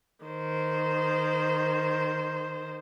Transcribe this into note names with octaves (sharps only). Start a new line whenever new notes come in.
D#3 C5